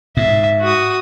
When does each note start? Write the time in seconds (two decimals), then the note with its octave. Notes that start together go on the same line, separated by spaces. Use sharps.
0.17 G#2 E5
0.61 F#4 D#6